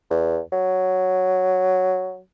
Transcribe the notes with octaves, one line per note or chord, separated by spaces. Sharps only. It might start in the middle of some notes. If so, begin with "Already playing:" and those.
E2
F#3